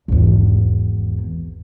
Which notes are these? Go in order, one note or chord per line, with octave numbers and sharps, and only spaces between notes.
G#1 E2